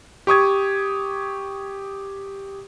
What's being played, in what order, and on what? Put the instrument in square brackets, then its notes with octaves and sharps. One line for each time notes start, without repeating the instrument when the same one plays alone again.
[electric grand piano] G4 C#6 D#6 G#6